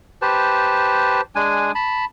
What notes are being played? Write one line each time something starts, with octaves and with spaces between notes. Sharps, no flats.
G4 B4 C5 A5
G#3 D4 G#5
A5 B5